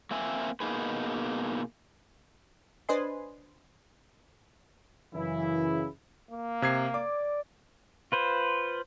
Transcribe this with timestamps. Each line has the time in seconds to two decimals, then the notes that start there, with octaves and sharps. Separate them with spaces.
0.11 A#3 C4 E5 G#5
0.60 B2 A#3 C#4 D#4 G#4 B4
2.89 D4 B4 C5 D#5 G#5 C6
5.14 F#2 C#3 E3 E4
6.30 A#3
6.62 C3 G#6 C7
6.94 D5 D6
8.12 F4 B4 C5